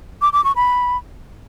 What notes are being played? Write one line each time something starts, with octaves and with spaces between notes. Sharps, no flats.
D6
D6
C#6
B5